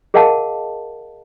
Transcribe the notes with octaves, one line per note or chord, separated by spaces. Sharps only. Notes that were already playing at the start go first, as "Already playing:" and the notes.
G#4 A#4 D#5 F5 F#5 A5